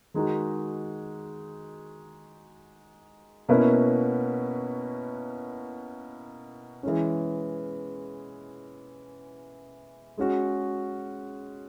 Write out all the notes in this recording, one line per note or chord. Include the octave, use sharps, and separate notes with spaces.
D#3 G#3 D#4 F#4
B2 A#3 C#4 E4 B4
E3 G#3 C#4
G#3 C#4 F#4